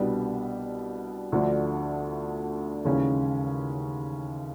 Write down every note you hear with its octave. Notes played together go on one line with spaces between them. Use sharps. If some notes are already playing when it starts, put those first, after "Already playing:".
Already playing: C2 B2 G3 B3 D4
D2 D3 F3 A3 D4
D#2 C#3 E3 G#3 C#4